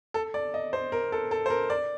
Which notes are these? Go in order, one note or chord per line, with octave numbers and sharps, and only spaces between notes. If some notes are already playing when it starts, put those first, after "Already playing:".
A4
D5
D#5
C5
A#4
A4
A4
C5
A#4
D5